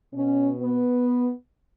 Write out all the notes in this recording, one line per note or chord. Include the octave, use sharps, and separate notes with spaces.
B2 C#4
B3